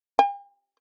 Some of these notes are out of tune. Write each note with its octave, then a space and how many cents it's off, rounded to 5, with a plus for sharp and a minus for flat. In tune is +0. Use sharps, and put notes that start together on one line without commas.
G5 +45